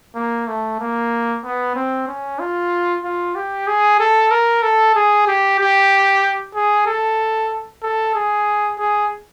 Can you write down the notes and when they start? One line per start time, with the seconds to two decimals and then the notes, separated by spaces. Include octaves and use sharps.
0.16 A#3
0.48 A3
0.80 A#3
1.44 B3
1.75 C4
2.08 C#4
2.39 F4
3.04 F4
3.35 G4
3.67 G#4
4.00 A4
4.31 A#4
4.63 A4
4.95 G#4
5.27 G4
5.59 G4
6.55 G#4
6.87 A4
7.83 A4
8.15 G#4
8.79 G#4